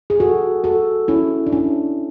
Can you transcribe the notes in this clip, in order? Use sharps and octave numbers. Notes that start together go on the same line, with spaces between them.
G#4
F#4 A4
F#4 A4
C#4 E4
D4
C#4 E4